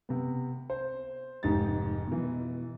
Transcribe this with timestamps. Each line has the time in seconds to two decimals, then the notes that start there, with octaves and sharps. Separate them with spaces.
0.09 C3 B3
0.70 C5
1.43 F1 G#2 D#4 G4 A6
2.07 B2 E3